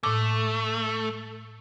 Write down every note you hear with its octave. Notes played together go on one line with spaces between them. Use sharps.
A2 A3 D6